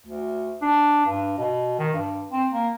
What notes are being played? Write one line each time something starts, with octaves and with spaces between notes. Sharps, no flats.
D2
D4
G2
B2
D#3
G2
C4
A#3